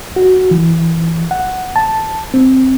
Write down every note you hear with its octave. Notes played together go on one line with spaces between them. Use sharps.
F#4
E3
F#5
A5
C4